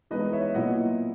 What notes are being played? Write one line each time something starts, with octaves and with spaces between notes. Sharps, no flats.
E3 G#3 B3 D#4 B4 D#5
C#5 E5
A#2 F#3 B3 E4 D#5 F#5